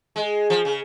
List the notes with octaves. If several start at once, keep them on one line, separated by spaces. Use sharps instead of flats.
G#3
F3
C#3